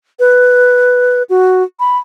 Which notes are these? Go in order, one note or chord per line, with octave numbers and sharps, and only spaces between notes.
B4
F#4
B5